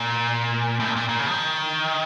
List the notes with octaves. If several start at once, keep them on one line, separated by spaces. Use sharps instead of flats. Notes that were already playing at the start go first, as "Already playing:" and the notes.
Already playing: A#2
A2
A#2
A#2
A#2
C#3
F3
D#3